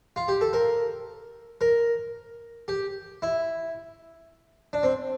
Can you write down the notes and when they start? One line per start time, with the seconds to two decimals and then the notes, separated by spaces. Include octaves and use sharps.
0.16 F4
0.28 G4
0.41 A4
0.53 A#4
1.61 A#4
2.68 G4
3.22 E4
4.73 D4
4.83 C4